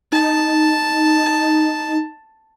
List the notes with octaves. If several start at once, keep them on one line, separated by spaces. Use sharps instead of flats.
D#4 A5